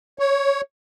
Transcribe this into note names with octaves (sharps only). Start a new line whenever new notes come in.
C#5